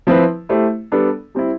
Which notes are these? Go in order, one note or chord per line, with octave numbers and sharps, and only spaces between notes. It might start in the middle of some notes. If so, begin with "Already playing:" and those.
F3 C4 E4 B4
A3 E4 G4 C5
G3 B3 D4 A4
G3 C4 E4